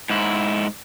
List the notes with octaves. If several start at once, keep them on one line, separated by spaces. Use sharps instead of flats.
G#2 E4